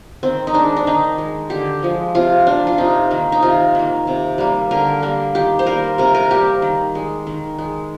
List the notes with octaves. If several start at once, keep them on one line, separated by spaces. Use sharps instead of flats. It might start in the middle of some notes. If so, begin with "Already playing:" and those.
D#3 C4
D#4
G#3 D4
D4
D#3 D#4
G#3
D3 G4
F3 G#3
C3 F4
F3 A#3 D4
F4
C3 D#4
D#3 A#3
D#4
C3 F4
D#3 A#3
C3
G3 A#3
D3 A#4
G3 A#3
D#3 G4
C5
G3 A#3 A#4
C3 A#4
A#4
G3 A#3 G4
D#3
G#3
D#3
G#3